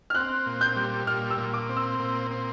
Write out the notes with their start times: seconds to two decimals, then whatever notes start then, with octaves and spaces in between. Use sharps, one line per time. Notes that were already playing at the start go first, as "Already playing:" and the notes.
0.10 F6
0.15 C4 F#6
0.46 A#2
0.61 G6
0.76 G3
1.07 A#2 F6
1.30 E6
1.38 A#2
1.54 D6
1.69 C4
1.77 E6
2.00 A#2
2.31 C4